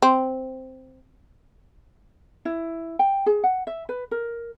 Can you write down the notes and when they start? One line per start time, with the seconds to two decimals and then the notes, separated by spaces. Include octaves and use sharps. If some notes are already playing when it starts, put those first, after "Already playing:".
0.02 C4
2.45 E4
2.99 G5
3.26 G#4
3.44 F#5
3.67 E5
3.89 B4
4.11 A#4